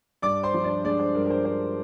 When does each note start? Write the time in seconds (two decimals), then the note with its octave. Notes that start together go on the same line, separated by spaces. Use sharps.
0.22 G2 D5 D6
0.43 C5 C6
0.54 F3
0.64 D4 D5
0.84 G#3 D4 D5
0.99 C5
1.14 G2 A#4
1.26 A#4
1.30 C5
1.45 G2 C5